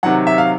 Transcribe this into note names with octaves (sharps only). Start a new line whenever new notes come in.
C3 D#3 F#3 F#5
E5
F5